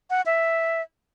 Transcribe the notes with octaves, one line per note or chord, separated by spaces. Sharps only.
F#5
E5